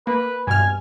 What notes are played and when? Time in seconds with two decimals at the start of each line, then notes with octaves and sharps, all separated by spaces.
0.07 A#3 B4
0.47 G2 B2 G#5 F6